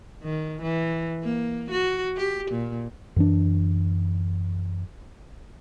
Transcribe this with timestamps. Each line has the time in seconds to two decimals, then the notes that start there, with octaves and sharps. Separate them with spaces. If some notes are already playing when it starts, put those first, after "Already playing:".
0.24 D#3
0.62 E3
1.23 A#3
1.71 F#4
2.17 G4
2.51 A#2
3.16 F#2 E3 D4